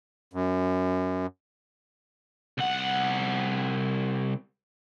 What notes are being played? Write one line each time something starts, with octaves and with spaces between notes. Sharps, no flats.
F#2
C2 F#5